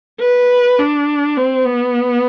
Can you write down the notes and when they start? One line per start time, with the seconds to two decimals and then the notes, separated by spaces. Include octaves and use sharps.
0.20 B4
0.79 D4
1.37 C4
1.65 B3